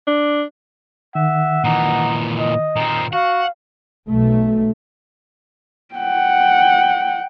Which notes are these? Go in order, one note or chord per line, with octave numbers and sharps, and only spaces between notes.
D4
D#3 E5 F#5
A#2 E3 D#4
D#5
A#2 C4 D#4
F#4 F5 F#5
B1 A3
F#5 G5